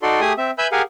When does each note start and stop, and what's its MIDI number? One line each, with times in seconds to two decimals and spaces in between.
0.02 0.21 63
0.02 0.21 66
0.02 0.21 69
0.02 0.21 74
0.02 0.21 84
0.21 0.33 57
0.21 0.33 67
0.21 0.33 68
0.21 0.33 80
0.21 0.33 87
0.38 0.51 60
0.38 0.51 76
0.58 0.67 71
0.58 0.67 76
0.58 0.67 80
0.58 0.67 83
0.58 0.67 88
0.58 0.67 91
0.72 0.82 67
0.72 0.82 68
0.72 0.82 70
0.72 0.82 77
0.72 0.82 78
0.72 0.82 80